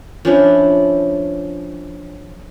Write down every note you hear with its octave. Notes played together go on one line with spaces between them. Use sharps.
F3 C#4 D4 E4